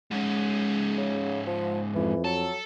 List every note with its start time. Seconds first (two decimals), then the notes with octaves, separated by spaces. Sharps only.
0.11 G#2 G#3 C#4
0.98 C#3
1.47 F3
1.95 F2 E3
2.24 F#3 A4